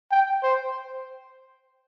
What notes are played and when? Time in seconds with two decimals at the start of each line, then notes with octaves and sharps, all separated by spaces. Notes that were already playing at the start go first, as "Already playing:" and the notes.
0.11 G5
0.43 C5